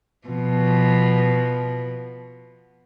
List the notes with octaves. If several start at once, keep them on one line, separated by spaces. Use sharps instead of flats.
B2 F3